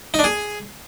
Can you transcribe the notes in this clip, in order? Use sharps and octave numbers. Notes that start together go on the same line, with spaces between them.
D#4
D4
G#4